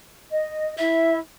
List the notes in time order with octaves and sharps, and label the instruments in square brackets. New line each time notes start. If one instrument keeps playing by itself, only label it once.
[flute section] D#5
[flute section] E4 [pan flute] E5